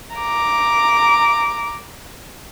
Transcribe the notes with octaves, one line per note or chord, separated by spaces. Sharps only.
A#5 D6